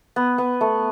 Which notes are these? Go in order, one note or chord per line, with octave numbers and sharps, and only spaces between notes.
B3
B3
A3